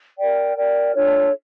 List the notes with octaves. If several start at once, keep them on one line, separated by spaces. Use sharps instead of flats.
A#4 D5 G5
A#4 D5 G5
D4 F4 A4 C#5